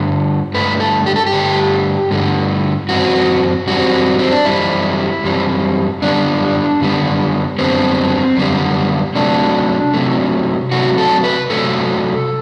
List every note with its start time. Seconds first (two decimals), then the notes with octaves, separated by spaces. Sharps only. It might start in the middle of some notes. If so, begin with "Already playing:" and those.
Already playing: G2 D3 A3
0.54 G2 D3 A3 B4
0.80 A4
1.06 G4
1.16 A4
1.26 G4
1.32 G2 D3 A3
2.11 G2 D3 A3
2.89 F#2 E3 C4 F#4
3.67 F#2 E3 G3 C4 F#4
4.19 C4
4.32 D4
4.45 F#2 E3 G3 E4
5.24 F#2 E3 G3 C4
6.02 F#2 D3 G3 B3 D4
6.81 F#2 D3 G3 B3
7.59 F#2 D3 G3 B3 C4
8.37 F#2 D3 G3 B3
9.15 C3 F#3 A3 D4
9.94 C3 F#3 A3
10.72 C3 F#3 A3 F#4
10.98 A4
11.24 B4
11.50 C3 F#3 A3 A4